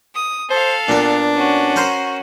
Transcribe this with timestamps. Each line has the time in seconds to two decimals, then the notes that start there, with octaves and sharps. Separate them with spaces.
0.14 D#6
0.50 A4 C5 F5
0.89 A#2 B3 D4
1.36 C#4 F#4
1.76 A#4 C5 C6